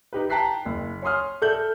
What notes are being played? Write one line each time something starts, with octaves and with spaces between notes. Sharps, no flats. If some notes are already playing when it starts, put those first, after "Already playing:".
D#4 G4 B4
G5 A5 A#5 F#6 B6 C7
F#1
C#5 G#5 C6 D#6 F6
A4 D5 E5 G6 F#7